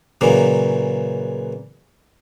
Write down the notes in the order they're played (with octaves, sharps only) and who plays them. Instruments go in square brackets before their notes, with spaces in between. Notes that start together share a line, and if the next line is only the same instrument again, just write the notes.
[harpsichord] A#2 C#3 E3 F#3